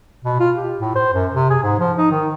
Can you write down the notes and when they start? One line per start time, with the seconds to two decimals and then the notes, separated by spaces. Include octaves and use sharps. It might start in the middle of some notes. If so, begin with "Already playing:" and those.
0.24 B2
0.40 F4
0.56 G4
0.79 A2
0.96 C5
1.14 F#2
1.33 C3
1.50 G#4
1.63 G#2
1.79 F3
1.98 D#4
2.11 D#3